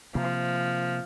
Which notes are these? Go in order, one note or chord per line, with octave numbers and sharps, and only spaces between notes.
C3 F3 A#3